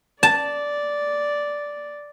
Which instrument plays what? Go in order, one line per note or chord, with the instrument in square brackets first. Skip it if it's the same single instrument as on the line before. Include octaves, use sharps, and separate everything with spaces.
[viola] D5 [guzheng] A5